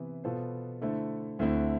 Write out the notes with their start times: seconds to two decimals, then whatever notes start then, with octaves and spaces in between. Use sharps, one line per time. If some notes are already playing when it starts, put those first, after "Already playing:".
Already playing: C3 E3 B3
0.24 B2 B3 F4 A4 C5
0.81 D3 A3 E4 A4 C5
1.39 D2 D3 A3 C4 E4